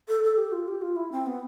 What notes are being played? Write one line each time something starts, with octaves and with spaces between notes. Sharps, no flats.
A4
A4
G4
F4
G4
F4
E4
C4
B3